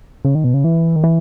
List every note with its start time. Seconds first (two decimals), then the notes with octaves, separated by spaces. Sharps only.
0.25 C#3
0.35 D#3
0.44 B2
0.54 C#3
0.64 E3
0.96 D#3
1.04 E3